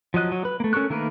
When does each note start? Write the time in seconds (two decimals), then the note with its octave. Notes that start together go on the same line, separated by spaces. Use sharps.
0.14 F3 F#3 D#5 F#6
0.32 F#3
0.45 B4
0.60 A3 A#3
0.73 C#4 A4 A#4 C#6 F#6
0.90 D#3 A3 A#3 A#4 B4